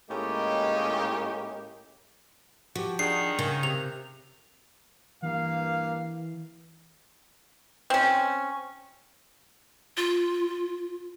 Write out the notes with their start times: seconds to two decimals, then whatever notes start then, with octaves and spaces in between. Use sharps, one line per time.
0.10 A2 G#3 A#3 C#4 D#4 G4
2.75 F3 F#4 G4
2.99 D#3 D4 G#4 F#5 C7
3.39 C#3 A#4
3.63 C3 F7
5.22 G2 E3 A#3 F5
7.90 C4 C#4
9.97 F4